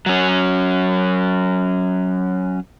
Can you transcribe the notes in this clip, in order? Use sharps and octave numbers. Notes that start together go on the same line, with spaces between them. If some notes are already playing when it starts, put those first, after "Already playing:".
F#3 C#4